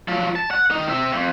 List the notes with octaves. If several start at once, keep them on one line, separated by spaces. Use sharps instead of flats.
F3 F#3
A5
F#5
D#3 D#4
C4 E5
F2